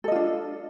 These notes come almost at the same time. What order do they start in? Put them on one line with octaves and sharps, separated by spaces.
A4 D#5 F4 D4